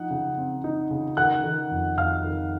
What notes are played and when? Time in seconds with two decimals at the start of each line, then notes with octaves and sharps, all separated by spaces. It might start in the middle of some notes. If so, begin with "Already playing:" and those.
Already playing: F3 D#4 F#5
0.11 C#3
0.38 C4
0.64 D#4
0.91 C#3
1.17 D#3 F#5 F#6
1.44 D#3
1.71 F2
1.97 F2 F5 F6
2.24 D#3